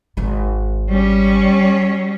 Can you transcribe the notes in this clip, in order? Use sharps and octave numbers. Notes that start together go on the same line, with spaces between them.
G#1 D#3
G3 C#4